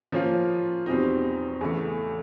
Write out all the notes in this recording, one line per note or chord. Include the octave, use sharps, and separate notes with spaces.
F3 A#3 C#4 F4
E2 B2 G3 C4 D#4
E2 C#3 E3 A3